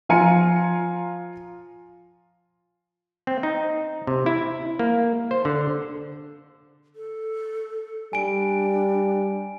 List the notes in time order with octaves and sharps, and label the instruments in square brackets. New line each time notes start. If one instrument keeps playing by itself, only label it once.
[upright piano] F3 F4 G#5 A#5 C#7
[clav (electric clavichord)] C4
D#4
C3
E4
A#3
C5
D3
[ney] A4
[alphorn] G3 [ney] D4 [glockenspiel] G#5 D7